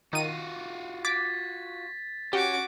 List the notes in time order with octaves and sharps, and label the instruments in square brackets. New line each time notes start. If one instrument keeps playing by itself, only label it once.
[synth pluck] D#3 D#7 [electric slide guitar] F4 F#4
[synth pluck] D6 [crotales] G#6 A6 B6
[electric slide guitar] C#4 [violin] F#4 D6 [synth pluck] G4